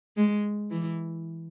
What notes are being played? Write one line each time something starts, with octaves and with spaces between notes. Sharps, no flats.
G#3
E3